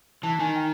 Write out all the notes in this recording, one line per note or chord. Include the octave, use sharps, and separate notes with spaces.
E3 A5
D#3 G#5
G5